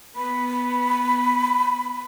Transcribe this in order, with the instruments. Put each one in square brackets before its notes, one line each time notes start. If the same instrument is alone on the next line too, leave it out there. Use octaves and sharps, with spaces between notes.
[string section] B3 [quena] B5